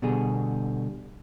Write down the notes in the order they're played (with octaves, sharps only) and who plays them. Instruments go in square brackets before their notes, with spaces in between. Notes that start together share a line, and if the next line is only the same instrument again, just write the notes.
[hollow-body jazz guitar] B2 D3 G3 G#4